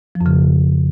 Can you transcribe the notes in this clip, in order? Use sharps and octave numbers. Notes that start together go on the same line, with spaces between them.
F3
F2
C#3